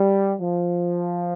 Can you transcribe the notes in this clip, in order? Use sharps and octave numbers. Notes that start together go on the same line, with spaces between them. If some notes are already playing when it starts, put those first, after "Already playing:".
Already playing: G3
F3